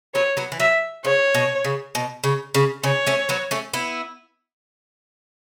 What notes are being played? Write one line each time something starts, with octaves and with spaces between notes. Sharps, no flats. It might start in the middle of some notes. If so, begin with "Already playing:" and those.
F#3 B3 C#5
F#3 B3
E3
F#3 E5
C#3 C#5
B2
C#3
B2
C#3
C#3
C#3 C#5
A3 C#4
F#3 B3
A3 C#4
B3 E4